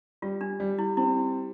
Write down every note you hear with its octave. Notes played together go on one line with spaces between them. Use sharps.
G3 F4
D4
G3
E4
C4 E4